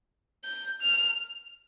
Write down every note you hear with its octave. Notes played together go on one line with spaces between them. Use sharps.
G6
F6